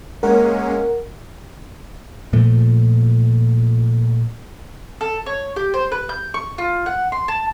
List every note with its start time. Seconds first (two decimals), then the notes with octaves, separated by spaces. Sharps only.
0.23 G#3 A#3 C#4 A#4 F#5
2.33 A#2 F3 A3
5.01 A4
5.26 C#5
5.56 G4
5.74 C5
5.92 B4
6.09 G6
6.34 C#6
6.58 F4
6.86 F#5
7.12 C6
7.28 A5